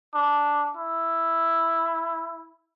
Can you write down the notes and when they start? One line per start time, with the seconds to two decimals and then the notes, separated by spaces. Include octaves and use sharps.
0.14 D4
0.77 E4